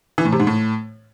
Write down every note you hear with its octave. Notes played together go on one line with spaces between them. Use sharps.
E3
A2
C3
G#2
A2